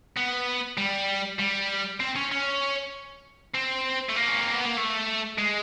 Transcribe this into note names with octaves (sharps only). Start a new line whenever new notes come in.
B3
G3
G3
C4
C#4
C#4
C4
A3
A#3
C#4
C4
B3
A#3
A3
G#3